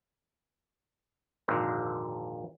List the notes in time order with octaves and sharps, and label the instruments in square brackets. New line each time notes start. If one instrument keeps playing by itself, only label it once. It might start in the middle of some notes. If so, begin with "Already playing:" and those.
[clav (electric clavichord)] G#1 F2 A#2 D3 G#3